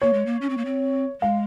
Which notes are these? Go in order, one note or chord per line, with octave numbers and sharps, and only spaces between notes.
A#3 C#5
G#3
A#3
C#4
C4
A#3
C4
G#3 F5